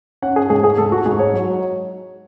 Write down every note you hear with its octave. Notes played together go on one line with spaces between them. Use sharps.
C#4 F#5
G#4
G#2 G#4
G#4
G#2 A4
F#4
G#2 G#4
C#5
F#3